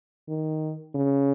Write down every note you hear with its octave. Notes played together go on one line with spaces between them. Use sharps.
D#3
C#3